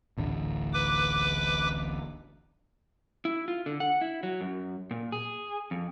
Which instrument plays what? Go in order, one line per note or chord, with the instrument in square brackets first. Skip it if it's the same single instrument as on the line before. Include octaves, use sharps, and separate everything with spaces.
[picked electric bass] D1 A1 D3
[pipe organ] B4 D6
[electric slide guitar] E4
F4
D3
F#5
E4
F#3
F#2
A#2
G#4
F2